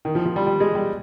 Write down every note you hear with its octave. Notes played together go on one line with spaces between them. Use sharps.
D#3
F3
F3
G3
G3
G#3
G3